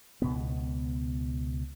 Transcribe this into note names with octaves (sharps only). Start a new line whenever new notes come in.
C#2 B2 B3